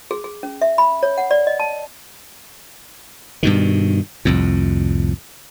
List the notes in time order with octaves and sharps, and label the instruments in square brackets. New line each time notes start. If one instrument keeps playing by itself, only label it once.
[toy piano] G#4
G#4
C#4
E5
B5
C#5
F#5
D5
D#5
A5
[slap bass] G2 B2 D#3
C2 F2 A2